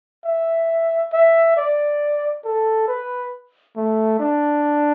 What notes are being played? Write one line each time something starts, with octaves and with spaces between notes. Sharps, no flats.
E5
E5
D5
A4
B4
A3
D4